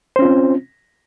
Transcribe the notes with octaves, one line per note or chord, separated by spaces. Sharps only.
C4 C#4 F4 C5